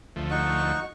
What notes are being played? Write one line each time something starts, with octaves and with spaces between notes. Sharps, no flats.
D2 F3 A3
D#4 F#4 C#6